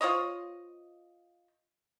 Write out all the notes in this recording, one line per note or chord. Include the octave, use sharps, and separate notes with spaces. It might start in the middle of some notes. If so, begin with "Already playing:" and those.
F4 C5 C#5 D#5